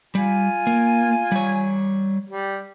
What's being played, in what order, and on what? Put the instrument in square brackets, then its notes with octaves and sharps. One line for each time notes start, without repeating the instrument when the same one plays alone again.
[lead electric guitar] G3 [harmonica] F4 G#5
[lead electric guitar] A#3
G3 C#5
[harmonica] G3